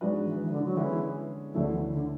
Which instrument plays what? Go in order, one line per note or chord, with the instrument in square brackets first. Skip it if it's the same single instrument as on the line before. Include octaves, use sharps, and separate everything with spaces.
[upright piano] G#2 G#3 D4 F#4 B4 [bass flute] F#3
[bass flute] E3
E3
D3
F#3
[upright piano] D3 G#3 C#4 E4 B4 [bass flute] E3
[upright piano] D2 D3 A3 C#4 E4 [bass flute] F#3
[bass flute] E3
D3